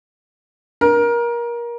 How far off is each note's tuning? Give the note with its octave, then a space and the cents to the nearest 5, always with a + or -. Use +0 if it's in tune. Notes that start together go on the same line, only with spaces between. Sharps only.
A#4 +25